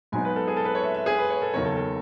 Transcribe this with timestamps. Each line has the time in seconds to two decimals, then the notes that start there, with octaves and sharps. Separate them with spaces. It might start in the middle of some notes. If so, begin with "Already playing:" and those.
0.12 G#2 F#3 B3 D#4 G#5
0.25 B4
0.36 A4
0.48 G#4
0.57 A4
0.65 B4
0.75 C#5
0.83 E5
0.94 E5
1.06 G#4
1.18 B4
1.30 C#5
1.42 A4
1.54 F#1 E2 D#3 F#3 C#5
1.65 A4
1.77 A4